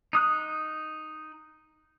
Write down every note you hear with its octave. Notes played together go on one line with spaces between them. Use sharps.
D#4 D#6 F#6